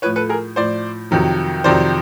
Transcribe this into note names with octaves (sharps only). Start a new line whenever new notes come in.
A2 F3 B4 C#5
A4 B4
G#4 A#4
A2 F3 C5 D5
F2 C3 D#3 F#3
F2 C3 D#3 F#3 C5 D5